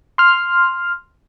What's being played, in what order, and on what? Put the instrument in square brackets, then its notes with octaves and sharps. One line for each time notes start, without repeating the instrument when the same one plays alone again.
[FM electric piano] C6 F6